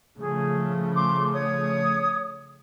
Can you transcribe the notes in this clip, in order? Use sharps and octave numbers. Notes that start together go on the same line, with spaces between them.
C#3 F3 A3 G#4
C6 D6
C#5 D#6